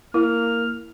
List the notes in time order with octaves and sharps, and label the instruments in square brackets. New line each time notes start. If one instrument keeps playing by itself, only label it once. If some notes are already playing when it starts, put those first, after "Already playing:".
[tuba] A#3 [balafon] E4 [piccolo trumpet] F6